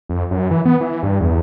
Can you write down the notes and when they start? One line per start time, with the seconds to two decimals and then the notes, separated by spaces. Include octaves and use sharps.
0.09 F2
0.31 F#2
0.51 E3
0.65 B3
0.81 E3
1.03 G2
1.21 E2